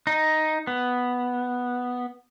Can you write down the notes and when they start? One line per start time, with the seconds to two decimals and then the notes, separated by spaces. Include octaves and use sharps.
0.07 D#4
0.67 B3